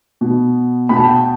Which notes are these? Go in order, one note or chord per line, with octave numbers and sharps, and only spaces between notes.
B2 B3
B2 B3 B5
A5
G5
A5